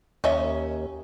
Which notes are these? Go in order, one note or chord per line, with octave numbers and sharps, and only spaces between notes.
D#2 C#4 D#5 E5